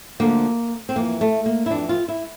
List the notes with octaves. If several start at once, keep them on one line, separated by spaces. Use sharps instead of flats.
D2 D3 F3 A#3
C4
F2 E3 A#3
A3
A#3
E4
F2 E3 D4
F4
E4